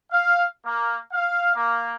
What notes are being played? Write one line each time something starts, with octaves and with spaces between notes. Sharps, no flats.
F5
A#3
F5
A#3